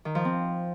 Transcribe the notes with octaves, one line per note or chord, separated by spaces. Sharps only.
D#3
F3
C4